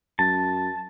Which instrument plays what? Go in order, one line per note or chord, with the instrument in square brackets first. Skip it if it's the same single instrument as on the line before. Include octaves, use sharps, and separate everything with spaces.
[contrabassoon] F#2 [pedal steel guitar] A5